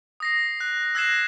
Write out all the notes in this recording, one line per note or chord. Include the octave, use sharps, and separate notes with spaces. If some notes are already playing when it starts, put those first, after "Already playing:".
D#6 A#6 C7
F#6
E6 F#6 G#6 A#6 C7 E7